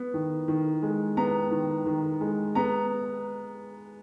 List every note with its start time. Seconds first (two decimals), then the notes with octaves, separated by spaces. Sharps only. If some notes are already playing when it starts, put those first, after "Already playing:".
Already playing: B3
0.14 D#3
0.48 D#3
0.82 G#3
1.17 B3 A#5
1.51 D#3
1.86 D#3
2.21 G#3
2.55 B3 A#5